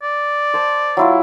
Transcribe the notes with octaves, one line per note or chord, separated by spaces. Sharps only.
D5
C5 A5 D6
F#3 E4 F4